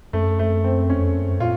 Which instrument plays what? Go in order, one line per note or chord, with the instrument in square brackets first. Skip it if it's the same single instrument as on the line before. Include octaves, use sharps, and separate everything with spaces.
[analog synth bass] F#2 [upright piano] A3
[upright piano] A3
C4
[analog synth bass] F2 [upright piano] C#4
[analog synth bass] F#2
[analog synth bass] A#2 [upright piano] F4